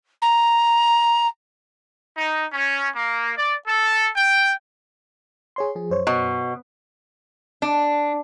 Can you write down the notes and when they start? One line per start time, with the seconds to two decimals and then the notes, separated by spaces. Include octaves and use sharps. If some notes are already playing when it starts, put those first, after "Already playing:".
0.21 A#5
2.17 D#4
2.53 C#4
2.95 A#3
3.38 D5
3.66 A4
4.16 G5
5.56 G#4 C#5 C6
5.75 F3 G#4
5.90 F#2 C5 C#5
6.07 B2
7.62 D4